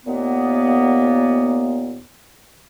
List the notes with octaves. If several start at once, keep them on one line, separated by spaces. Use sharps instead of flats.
D#2 A#2 A#3 B3